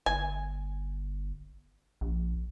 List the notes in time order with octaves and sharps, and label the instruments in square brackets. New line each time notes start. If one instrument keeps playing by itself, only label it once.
[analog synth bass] G1 [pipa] G#5
[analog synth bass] A#1